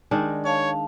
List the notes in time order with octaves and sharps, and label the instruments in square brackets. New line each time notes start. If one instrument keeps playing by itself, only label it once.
[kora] D#3 G#3 D4
[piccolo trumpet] C#5 [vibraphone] F5 A5